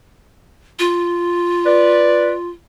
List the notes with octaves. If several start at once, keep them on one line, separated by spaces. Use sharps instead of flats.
F4
B4 D5